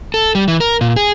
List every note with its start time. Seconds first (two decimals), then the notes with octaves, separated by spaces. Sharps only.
0.14 A4
0.35 G3
0.48 E3
0.60 A#4
0.81 A#2
0.96 G#4